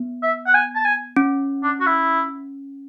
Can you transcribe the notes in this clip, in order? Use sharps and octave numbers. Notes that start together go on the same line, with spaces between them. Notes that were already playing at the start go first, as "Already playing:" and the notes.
Already playing: B3
E5
F#5
G#5
A5
G#5
C#4
D4
F#4
E4